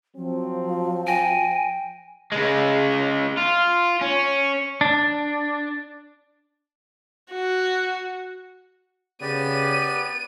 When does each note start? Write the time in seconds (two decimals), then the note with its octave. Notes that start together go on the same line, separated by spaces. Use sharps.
0.16 F3 F#3 C4
1.07 G5 G#5 A#6 D7
2.32 C#3 G#3
3.37 F4
4.01 C#4
4.81 D4
7.32 F#4
9.22 C#3 B3 G4 D5 D#7